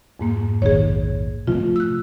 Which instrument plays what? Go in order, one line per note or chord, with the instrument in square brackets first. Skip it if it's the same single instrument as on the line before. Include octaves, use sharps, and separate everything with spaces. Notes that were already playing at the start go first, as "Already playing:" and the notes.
[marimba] F2 G#2 A#3
[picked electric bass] F1 A#1 D#3 [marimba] G#4 C#5
[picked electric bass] C3 F3 A3 [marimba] F4
[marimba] E6 F#6